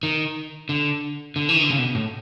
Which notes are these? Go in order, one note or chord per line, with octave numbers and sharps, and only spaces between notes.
D#3
D3
D3
E3
D#3
D3
C#3
B2
A2